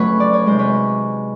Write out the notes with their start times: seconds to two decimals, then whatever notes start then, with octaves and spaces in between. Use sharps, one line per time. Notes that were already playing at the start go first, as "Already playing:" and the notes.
Already playing: F2 C#3 F#3 A3 B4 C#5
0.20 D5
0.33 C#5
0.46 C3 D#3 G#3 C5
0.59 B4 C#5